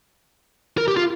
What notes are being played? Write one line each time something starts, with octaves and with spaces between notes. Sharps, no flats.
A#4
G4
F4